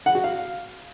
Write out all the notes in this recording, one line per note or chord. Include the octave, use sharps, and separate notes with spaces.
F#5
F#4
F5